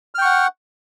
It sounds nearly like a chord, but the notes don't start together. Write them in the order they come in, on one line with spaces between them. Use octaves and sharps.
F6 G5 C#6 F#5